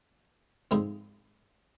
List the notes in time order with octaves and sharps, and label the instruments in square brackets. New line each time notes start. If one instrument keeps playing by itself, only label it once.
[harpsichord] G#2 F3 G#3 C4